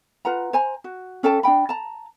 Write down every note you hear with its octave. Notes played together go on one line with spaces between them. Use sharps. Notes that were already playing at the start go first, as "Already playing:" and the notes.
F4 B4 F#5 A#5
C5 G#5 A#5
F#4
C#4 A4 G5 A5
D4 D#4 G5 B5
A5 A#5